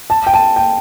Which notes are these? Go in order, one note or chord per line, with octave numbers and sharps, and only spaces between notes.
A5
G5
A5
G5